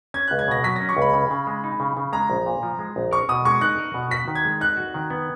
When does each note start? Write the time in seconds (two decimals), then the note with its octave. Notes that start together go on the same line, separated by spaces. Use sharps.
0.14 C#4 G#6
0.27 F#6
0.31 C#2
0.39 G#6
0.48 B2 A#6
0.64 F#3 B6
0.76 A#6
0.81 C#4
0.89 C#6
0.97 C#2
1.02 B5
1.13 C#3 B5
1.31 C#3
1.47 G#3
1.64 D#4
1.80 C#3
1.97 C#3
2.13 G#3 A#5
2.30 A#1
2.46 A#2
2.63 F3
2.79 G#3
2.96 A#1
3.11 A#4 C#6
3.29 B2 D#6
3.45 G#3 C#6
3.61 D#4 F#6
3.78 A#4
3.94 B2
4.11 F#4 B6
4.28 D#3
4.35 G#6
4.45 G#3
4.61 D#4 F#6
4.77 F#4
4.94 D#3
5.10 B3